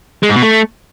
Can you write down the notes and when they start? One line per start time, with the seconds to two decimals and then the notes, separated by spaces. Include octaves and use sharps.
0.23 G#3
0.29 G#2
0.36 B2
0.42 A3